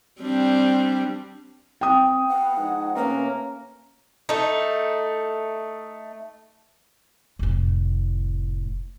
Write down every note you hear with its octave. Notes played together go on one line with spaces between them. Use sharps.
G3 C4 D4
C4 G5 D#6
B3 F5 F#5
F3 G#3 D#4
C3 A3 A#3 C#4 B4
A3 D#4
F1 A2